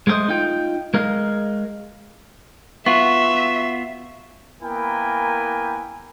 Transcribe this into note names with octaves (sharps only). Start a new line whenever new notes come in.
G#3 A3 B3 C5 D#5
D#4 F4 G5
G#3 A#4 D#5 F5
B3 F4 F#4 E5 C#6
A#3 B3 E4 A#4 G5 G#5